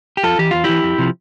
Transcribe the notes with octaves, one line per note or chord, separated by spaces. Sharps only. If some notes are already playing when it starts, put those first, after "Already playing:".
G4
F2 F4 A4
E3 G4
E2 F4
E3 E4 G4
F2
C3 F3